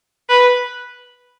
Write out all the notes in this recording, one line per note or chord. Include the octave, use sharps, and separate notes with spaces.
B4